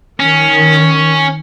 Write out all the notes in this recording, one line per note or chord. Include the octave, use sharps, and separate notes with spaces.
D#3 C#4